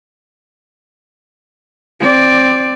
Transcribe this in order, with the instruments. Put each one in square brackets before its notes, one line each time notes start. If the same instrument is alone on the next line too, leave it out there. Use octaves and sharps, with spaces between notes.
[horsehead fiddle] C4 D5